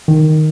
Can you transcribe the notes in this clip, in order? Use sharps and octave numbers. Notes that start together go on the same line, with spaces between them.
D#3